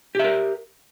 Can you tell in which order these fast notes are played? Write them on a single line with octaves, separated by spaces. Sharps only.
G4 E5 A#4